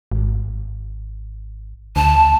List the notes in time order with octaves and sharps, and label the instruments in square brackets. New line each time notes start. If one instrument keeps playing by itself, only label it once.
[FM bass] G#1
[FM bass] D2 [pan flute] A5